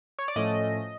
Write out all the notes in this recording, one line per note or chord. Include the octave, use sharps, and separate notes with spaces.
C#5
D5
A2 F3 A3 C#4 D#5